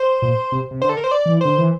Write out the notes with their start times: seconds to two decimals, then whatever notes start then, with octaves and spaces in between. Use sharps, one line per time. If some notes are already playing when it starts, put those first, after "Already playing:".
Already playing: C5
0.22 A#2
0.52 C3
0.71 C3
0.82 D3 C5
0.89 A4
0.97 A#4
1.04 C5
1.11 D5
1.25 E3
1.41 D3 C5
1.58 E3